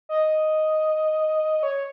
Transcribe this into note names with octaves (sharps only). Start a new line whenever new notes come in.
D#5
C#5